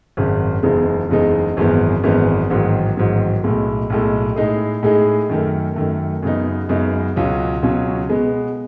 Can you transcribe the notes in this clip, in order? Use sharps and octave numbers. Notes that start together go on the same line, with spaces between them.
G#1 F#2 C#3
F#1 E2 C#3 G#3 D#4
F#1 E2 C#3 G#3 D#4
G#1 F#2 E3 G#3 B3
G#1 F#2 E3 G#3 B3
A1 G#2 D#3 F#3
A1 G#2 D#3 F#3
B1 A2 G#3
B1 A2 G#3
A2 G#3 D#4 G#4
A2 G#3 D#4 G#4
F#2 D#3 A3
F#2 D#3 A3
F#2 C#3 G#3 B3 D#4
F#2 C#3 G#3 B3 D#4
C#2 B2 F#3 C#4
C#2 B2 F#3 C#4
B2 G#3 B3